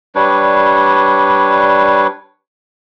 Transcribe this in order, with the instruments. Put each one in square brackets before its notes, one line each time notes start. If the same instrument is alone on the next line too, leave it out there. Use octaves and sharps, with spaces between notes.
[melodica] G3 D4 B4 C#5